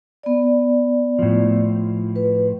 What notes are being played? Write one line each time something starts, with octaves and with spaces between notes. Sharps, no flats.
B3 D5
A2 F3
B4